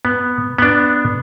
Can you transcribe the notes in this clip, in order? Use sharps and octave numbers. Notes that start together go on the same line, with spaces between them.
B3
B3 D4